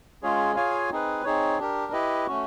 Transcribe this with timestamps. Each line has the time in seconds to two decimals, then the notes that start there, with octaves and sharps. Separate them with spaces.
0.23 G#3 C#4 F4 G#4 C#5
0.56 F4 G#4 C#5 F5 G#5
0.91 C4 D#4 G#4 B4
1.24 C4 D#4 G#4 C#5
1.59 D4 G4 A#4
1.92 E4 G4 B4 D#5
2.27 A3 C#4 F#4